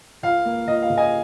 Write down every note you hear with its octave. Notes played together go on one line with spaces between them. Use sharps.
C#2 F5
A#3
C#2 D#5
F5
C#3
D#5 G#5